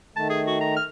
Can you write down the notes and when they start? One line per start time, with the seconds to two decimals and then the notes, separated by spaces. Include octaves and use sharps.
0.16 D#3 A3 A5
0.30 G#4
0.47 F#4
0.61 A#5
0.76 F6